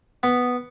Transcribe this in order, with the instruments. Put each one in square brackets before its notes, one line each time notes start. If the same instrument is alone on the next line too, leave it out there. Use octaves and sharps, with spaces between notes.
[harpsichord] B3